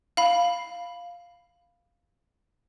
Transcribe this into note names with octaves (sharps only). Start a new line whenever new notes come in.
F5 B5